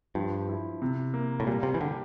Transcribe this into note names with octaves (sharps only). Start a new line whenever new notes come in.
G2 F3
E4
C3
A#3
A2
A#2 G3
C3
E3
D3 G4